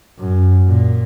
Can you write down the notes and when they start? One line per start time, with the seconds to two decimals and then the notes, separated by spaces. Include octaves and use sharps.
0.19 F#2
0.67 A#2